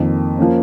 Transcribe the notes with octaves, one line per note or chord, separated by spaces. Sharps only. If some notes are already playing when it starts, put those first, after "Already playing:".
Already playing: F2 D#3 A#3
F3 A#3 C#4